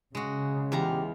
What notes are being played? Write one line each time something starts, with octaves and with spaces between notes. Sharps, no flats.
C#3 G#3 F#4
E2 F4 G4 A#5